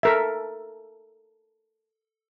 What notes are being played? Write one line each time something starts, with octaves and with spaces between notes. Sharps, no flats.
A4 A#4 E5